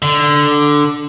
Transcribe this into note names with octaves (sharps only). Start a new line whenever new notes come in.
D3